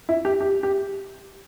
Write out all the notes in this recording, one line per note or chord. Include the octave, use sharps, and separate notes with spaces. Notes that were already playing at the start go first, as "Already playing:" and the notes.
E4
G4
G4
G4